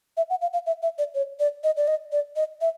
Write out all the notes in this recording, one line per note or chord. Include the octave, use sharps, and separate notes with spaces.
E5
F#5
F5
F5
E5
E5
D5
C#5
D5
D#5
D5
D#5
D5
D#5
E5